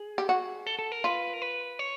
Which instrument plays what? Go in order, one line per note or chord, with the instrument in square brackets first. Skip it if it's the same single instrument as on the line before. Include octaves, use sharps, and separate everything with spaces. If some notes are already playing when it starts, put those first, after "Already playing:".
Already playing: [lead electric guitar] G#4
[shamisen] G4
F#4
[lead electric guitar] A4
A4
A#4
[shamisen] F4 [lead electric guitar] B4
[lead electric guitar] A#4
B4
C#5